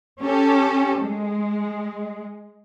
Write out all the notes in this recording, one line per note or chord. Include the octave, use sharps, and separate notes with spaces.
C#4 G4 A4
G#3